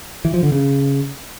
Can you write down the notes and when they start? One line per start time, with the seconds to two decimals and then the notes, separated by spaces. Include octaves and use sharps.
0.25 E3
0.34 F3
0.43 D3
0.52 C#3